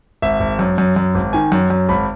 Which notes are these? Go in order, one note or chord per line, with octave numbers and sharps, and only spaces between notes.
G#1 E5
G#1
F#2
F#2
F#2
G#1
D#3 G#5
F#2
F#2
G#1 B5